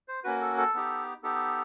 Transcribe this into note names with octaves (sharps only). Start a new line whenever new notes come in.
C5
A#3 C#4 F#4 B4
A4
A4
B3 D#4 G4
B3 D#4 G4 A4